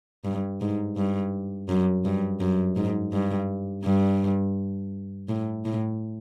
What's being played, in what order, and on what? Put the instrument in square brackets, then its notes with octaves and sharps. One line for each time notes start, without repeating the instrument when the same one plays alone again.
[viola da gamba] G2
G#2
G2
F#2
G2
F#2
G#2
G2
G2
A2
A2